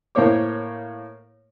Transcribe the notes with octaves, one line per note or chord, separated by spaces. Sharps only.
A2 A#3 C5 C#5 D6